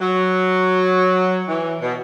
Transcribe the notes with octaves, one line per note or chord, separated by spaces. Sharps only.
F#3
E3
B2